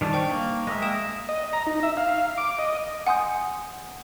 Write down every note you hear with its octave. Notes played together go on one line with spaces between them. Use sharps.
D#3 G3 D4
C5 G5 C#6
A#3
G#3 A#3 E5 A#6
G5 D#6 E7
D#5
A#5
D#4
E5
F5
D6
D#5
F#5 G#5 C6 D#6 G6